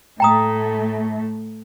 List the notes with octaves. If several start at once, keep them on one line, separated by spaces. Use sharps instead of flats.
A2 A3 G5 A#5 D#6